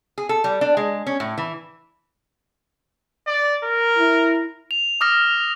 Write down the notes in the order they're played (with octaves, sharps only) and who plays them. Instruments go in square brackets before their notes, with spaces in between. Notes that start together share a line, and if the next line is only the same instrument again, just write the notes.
[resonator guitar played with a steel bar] G#4
A4
G3
D4
G#3
C#4
A2
E3
[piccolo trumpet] D5
A#4
[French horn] E4
[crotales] F7
D6 D#6 F6 A#6